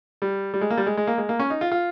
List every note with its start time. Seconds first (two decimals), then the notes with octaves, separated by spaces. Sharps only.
0.22 G3
0.54 G3
0.61 G#3
0.70 A#3
0.77 G3
0.87 G#3
0.97 G#3
1.07 A#3
1.18 G#3
1.29 A#3
1.39 C#4
1.50 D#4
1.61 F4
1.72 F4